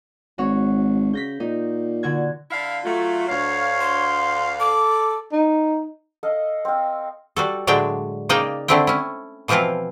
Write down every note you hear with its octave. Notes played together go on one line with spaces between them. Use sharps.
G#1 F#4 C#5
C#3 G6 A#6 B6
A#2 D#4
D3 F#4 G#6
D3 E4 F5
F#3 A3 F4
D2 C#5 F5
C6
A4 D6
D#4
A4 D#5 F5
C4 F5
G3 F#4 A4
A2 D3 F#3 G#3 D4 G5
C#3 A#3 D#4 D5 G5
D3 A3 C4 E4 G5
C#4 E4
B2 E3 F3 C4 E4 F4